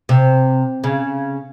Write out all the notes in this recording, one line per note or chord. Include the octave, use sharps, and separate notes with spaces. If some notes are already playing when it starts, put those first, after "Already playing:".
C3
C#3